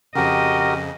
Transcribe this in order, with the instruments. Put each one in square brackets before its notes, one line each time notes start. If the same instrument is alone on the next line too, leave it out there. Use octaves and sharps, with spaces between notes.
[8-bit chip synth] F2 C#3 [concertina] F#4 G4 A#4 [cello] D#5